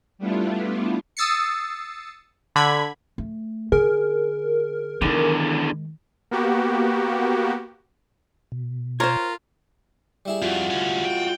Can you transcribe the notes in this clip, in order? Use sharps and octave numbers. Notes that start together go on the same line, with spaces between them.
G3 A3 B3 D4 E4 F4
D#6 E6 A6 C7 C#7
D3 B5 G#6
A3
D3 G#4 A#4
E2 D3 D#3 G#3
A#3 B3 F#4 G4
B2
F4 A#4 C5 C#5
G3 E4 G#4
F2 F4 F#4
D2 C#4
G5